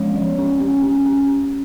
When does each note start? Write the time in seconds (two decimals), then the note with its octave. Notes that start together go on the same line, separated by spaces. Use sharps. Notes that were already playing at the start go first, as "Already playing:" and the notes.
Already playing: F3 G#3 C#4 C#5
0.16 F3
0.39 C#4
0.60 C#4
0.83 C#4
1.06 C#4